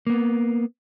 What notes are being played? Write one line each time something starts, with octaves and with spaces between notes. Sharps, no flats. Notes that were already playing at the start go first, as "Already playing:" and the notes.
A#3 B3